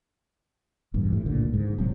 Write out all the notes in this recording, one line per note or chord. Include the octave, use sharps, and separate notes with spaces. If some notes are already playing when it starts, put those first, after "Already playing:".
E1 A1 G2
A2
C#2 A#2 D3
G#2
D1 C3 F#3